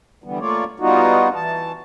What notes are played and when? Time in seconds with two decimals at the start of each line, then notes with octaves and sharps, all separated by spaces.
0.24 D3 E3 G3 B3
0.39 A3 A#3 F4 C#5 D5
0.80 G3 B3 D#4 F4 F#4
1.35 E3 A5